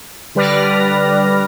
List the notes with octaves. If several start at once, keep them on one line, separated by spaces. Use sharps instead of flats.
D3 G3 B4 D5 F6 A#6